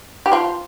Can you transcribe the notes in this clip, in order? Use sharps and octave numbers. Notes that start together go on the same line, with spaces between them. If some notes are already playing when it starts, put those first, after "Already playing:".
G4
F3 F4